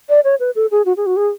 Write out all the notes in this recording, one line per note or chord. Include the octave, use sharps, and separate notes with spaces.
D5
C#5
B4
A4
G#4
F#4
G#4
F#4
G#4